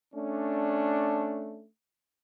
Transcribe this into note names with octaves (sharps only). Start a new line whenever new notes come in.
A3 C#4 D4